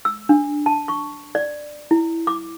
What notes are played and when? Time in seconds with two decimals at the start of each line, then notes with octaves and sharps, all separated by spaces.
0.05 E6
0.29 D4
0.66 A5
0.88 C#6
1.35 D5
1.91 E4
2.27 D6